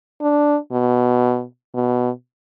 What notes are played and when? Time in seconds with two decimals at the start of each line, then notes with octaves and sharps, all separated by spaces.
0.22 D4
0.72 B2
1.74 B2